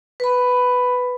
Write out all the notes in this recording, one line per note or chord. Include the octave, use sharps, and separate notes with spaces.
B4 B5